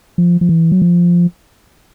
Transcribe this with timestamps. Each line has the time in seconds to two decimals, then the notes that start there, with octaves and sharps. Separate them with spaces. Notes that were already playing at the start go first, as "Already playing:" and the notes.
0.18 F3
0.41 F3
0.49 E3
0.72 F#3
0.82 F3